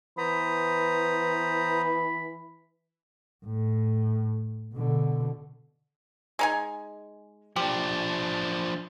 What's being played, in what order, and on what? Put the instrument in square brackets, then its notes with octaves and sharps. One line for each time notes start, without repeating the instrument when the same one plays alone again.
[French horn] E3 [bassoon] B3 [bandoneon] C5 A#5 D#6 [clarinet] B5
[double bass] A2
B2 D3
[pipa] G#3 D#4 G#5
[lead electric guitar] F3 D4 [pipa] G4